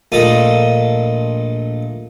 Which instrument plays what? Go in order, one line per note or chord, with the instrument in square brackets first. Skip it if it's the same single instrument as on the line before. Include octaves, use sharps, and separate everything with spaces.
[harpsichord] A#1 A#2 A3 D#4 A4 D#6